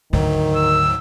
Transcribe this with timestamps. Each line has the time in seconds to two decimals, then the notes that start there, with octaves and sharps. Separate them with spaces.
0.13 D2 G#2 D3 D#3 F#3
0.56 E6